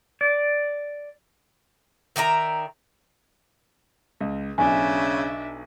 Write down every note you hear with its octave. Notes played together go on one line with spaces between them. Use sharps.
D5
D#3 D5 E5 A#5
C#2
B1 C#3 D4 E5 G#5